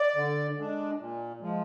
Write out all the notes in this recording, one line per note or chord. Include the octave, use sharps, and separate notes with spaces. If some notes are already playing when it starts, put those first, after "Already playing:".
Already playing: D5
D3
G#3 D4
A#2
F3 G#3